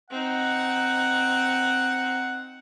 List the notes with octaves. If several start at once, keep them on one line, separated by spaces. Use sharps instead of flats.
C4 D#4 F#5